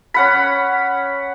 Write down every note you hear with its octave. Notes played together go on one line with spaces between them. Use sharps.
C#4 F#5 B5